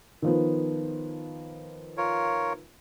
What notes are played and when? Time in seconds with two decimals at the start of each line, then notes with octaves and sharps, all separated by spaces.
0.22 D#3 F3 B3
1.97 F4 A#4 C#5